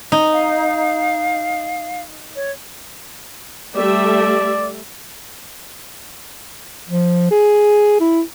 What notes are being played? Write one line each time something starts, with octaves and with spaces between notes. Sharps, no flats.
D#4
F5
C#5
G3 A3 D5 E5
F3
G#4
E4